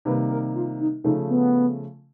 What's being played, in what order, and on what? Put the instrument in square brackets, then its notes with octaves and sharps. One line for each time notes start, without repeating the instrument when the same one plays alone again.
[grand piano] C3 D#3 G3 A#3 [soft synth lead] B4
[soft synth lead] A#4
F4
D#4
[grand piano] C#3 F3 A3 [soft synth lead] D#4
[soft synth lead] B3